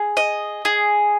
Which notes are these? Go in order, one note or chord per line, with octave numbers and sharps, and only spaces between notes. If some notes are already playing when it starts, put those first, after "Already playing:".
Already playing: G#4
D#5
G#4